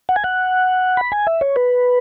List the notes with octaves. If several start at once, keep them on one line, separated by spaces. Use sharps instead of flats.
F#5
G#5
F#5
B5
G#5
E5
C#5
B4